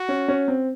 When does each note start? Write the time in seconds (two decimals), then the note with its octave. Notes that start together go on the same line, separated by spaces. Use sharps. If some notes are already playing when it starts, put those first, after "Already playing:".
Already playing: F#4
0.09 C#4
0.28 C#4
0.48 C4